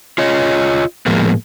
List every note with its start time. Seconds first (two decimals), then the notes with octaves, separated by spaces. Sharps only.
0.18 F4 C#5 D#5
1.06 A2 F3 G#3 A#3 B3